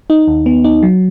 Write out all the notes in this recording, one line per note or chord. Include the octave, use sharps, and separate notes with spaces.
D#4
D#2
B3
D#4
F#3